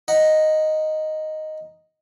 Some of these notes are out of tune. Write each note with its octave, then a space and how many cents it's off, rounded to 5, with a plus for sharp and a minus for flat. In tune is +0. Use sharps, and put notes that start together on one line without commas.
D#4 +0 F#5 +0